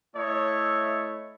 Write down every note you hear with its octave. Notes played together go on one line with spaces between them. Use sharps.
A3 E4 C#5 D#5